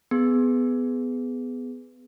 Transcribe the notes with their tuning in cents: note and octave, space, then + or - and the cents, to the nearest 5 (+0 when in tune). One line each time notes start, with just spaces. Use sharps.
B3 +15 G#4 +0